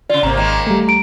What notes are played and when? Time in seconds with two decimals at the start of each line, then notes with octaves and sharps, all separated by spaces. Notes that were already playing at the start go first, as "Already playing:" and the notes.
0.10 C#3 F4 D5
0.23 G#1 C3 A#3 A#5
0.37 D#3 G#3 A#3
0.67 G3 A3
0.88 A#5 D7